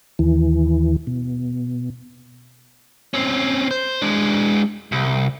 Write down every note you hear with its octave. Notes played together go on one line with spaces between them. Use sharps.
D#2 E3
B2
C4 C#4
C5
G#3 D4
C2